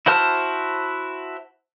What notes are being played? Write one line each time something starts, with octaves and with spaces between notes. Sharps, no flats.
E4 F#4 C5 A5 F6